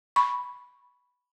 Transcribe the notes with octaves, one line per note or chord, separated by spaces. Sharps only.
B5 C#6